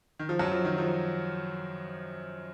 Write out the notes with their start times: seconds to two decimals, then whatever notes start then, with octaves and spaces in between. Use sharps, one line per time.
0.19 D#3
0.29 F3
0.39 F#2 F#3
0.52 F3
0.65 D#3
0.78 F3